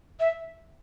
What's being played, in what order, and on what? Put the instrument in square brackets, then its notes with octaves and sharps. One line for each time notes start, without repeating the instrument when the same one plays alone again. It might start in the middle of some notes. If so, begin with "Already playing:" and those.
[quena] E5